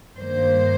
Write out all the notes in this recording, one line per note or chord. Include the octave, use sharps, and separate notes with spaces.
G2 D#3 A#3 C5